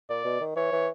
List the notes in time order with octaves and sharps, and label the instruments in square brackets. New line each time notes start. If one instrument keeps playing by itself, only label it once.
[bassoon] A#2 [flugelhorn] D5
[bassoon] B2
D#3
[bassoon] E3 [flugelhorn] C#5
[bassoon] E3